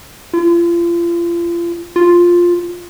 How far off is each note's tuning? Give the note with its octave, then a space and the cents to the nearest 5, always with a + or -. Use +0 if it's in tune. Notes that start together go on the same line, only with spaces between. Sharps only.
F4 -35
F4 +5